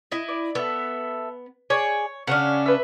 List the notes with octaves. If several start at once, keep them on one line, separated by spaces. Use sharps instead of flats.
E4 D#5
D5
B3 A4 E5
G#4 C#5 D5
C#3 C#4 D4 F#5 C#6 F6
B4 E5